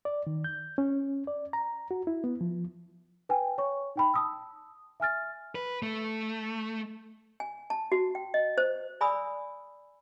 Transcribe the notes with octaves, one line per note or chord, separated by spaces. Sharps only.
D5
D#3
G6
C#4
D5
A#5
F#4
E4
B3
F3
B4 G5 G#5
C#5 C#6
D#4 G5 B5
A5 D#6 E6
E5 G#5 F6 A6
B4
A3
G#5
A5
F#4
G5
D#5
C5
D5 G#5 B5 D#6 E6